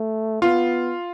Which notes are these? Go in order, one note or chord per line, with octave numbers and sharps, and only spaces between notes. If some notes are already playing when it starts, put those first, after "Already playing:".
Already playing: A3
B3 F4